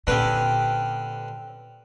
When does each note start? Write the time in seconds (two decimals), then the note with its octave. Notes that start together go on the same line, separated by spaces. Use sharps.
0.07 A#2 D3 C4 C#4 G4 B4